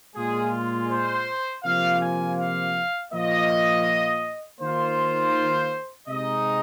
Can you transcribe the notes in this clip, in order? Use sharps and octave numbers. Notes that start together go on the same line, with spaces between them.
A#2 G#3 F4 G#4
C5
C3 F3 A#3 F4 F5
G#5
F5
A#2 F3 A#3 F4 D#5
D#3 A#3 F4 C5
C3 G#3 D#4 D#5